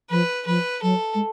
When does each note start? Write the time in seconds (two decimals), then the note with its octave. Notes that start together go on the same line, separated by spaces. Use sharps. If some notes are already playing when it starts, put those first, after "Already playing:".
0.10 F3 B4
0.47 F3 B4
0.83 F#3 A4
1.15 G#3